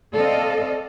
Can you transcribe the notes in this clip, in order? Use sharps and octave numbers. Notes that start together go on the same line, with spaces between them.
C4 A4 D5 D#5 F5